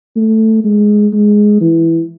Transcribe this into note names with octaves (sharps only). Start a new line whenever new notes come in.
A3
G#3
G#3
E3